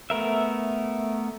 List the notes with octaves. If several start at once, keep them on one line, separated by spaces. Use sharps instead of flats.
A3 B3 A#4 E5